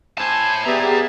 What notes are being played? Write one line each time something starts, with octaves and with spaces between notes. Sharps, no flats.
E4 C5 G#5 A5
B3 G4 G#4 D5 E5 A#5